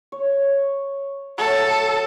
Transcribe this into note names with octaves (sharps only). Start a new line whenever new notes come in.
C#5
F#3 A3 A4